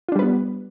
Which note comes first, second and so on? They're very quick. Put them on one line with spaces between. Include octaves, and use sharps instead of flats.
F4 D4 G3 B4 B3